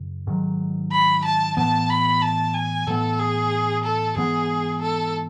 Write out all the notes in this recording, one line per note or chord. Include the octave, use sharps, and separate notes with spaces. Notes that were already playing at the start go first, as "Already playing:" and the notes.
Already playing: F#2 C#3
G#2 D#3 F#3
B5
A5
A2 E3 B3 A5
B5
A5
G#5
A2 E3 B3 A4
G#4
A4
G#2 E3 B3 G#4
A4